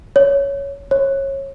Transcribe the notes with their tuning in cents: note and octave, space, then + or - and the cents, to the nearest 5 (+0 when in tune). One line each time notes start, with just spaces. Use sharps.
C#5 +10
C#5 -25